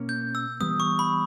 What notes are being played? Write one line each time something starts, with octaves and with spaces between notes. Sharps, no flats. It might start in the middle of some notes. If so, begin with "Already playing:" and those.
Already playing: B2 A#3 C#4
G6
E6
E3 G3 B3 D#6
C#6
B5